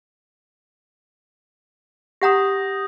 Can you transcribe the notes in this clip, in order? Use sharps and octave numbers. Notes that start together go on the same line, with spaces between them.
G4 F#5 A#5 D#6 G6 A#6